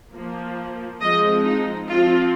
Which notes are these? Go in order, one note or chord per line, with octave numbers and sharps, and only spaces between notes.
F3 A#3
F3 G#3 C4 D#5
D#4
F3 C4 F4